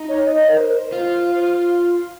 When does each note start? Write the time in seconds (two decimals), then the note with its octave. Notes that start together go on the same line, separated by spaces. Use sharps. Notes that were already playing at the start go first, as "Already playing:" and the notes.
Already playing: D#4
0.08 C#5
0.25 D#5
0.48 A#4
0.59 C5
0.92 F4